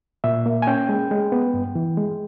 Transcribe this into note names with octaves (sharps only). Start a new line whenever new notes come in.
A#2 E5
A#3
G#5
C#4 G5
G#3
G#3
B3
G2
E3
G#3